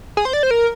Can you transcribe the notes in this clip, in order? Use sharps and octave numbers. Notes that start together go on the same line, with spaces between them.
G#4
C5
D5
C5
A#4